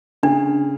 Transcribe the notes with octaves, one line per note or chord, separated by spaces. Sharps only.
C#3 D4